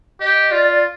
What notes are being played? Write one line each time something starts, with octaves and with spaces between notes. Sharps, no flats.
G4 D#5
F4 D5
D5